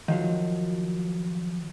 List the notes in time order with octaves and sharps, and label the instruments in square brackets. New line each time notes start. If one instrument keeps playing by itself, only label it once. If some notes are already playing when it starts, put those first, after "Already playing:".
[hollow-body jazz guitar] D#3 F3 F#3